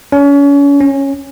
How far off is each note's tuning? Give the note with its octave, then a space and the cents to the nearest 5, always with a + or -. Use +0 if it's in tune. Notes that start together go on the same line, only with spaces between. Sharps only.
C#4 +35
C#4 -10